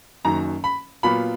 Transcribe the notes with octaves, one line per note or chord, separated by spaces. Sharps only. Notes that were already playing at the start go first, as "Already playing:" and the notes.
F#1 F#2 D#3 A#5
B5
A#2 F#3 B3 F4 B5